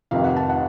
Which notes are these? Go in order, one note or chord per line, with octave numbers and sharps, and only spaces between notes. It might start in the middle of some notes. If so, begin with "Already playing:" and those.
F1 F2 C3 D#3 F5
F#5
A5
F#5